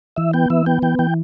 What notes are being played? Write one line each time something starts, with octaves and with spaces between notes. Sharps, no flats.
E3 E5
B3 G5
E3 E5
B3 G5
E3 G5
E3 G5